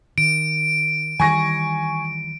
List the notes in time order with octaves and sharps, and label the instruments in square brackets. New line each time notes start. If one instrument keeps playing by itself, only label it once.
[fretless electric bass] D#3 [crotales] D7
[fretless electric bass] D#3 E3 G3 [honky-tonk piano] G#5 C#6 A#6